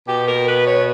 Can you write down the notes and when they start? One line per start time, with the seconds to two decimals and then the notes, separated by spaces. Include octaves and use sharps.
0.08 B2 G4
0.28 A#4
0.48 B4
0.66 C#5